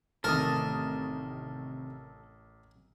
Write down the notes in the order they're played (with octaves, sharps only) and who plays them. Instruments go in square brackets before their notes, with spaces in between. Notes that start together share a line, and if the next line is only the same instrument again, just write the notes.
[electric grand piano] A1 D#6 [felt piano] C3 D#3 A3 [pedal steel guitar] A4 A5 [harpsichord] A#4